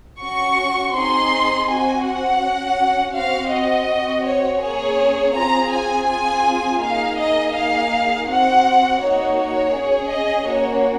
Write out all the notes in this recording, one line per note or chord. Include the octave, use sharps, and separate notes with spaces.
C#4 F#4 C#6
C4 D#4 G#4 C6
C4 F#4 G#5
F#5
C#4 F#4
C4 F#4 F5
D#5
C4 F#4
C#5
A#3 C#4 G#4 C#5
C4 F4 G#4 A#5
G#5
C4 F4 G#4 G#5
A#3 D#4 G#4 F5
D#5
A#3 D#4 G#4 F5
C4 F#4 F#5
A#3 D#4 F#4 C#5
C#5
C#4 G#4
D#5
A#3 C#4 F#4 C#5